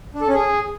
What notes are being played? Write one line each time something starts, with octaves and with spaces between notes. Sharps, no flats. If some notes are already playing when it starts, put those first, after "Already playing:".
D4
A4
C#4
G#4